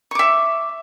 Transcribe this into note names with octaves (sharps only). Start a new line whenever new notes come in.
E5 C#6 D6